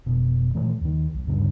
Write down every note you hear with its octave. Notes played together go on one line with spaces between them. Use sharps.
F1 B2
A#2 D#3 E3 A3
D#2 D#3
B1
D2 G2 C#3 D4